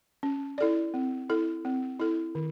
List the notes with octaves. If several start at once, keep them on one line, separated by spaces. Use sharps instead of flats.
C#4
E4 A4 D5
C4
E4 A4
C4
E4 A4
D#3